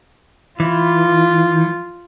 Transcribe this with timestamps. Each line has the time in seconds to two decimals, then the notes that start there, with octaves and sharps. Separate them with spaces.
0.60 E3 F4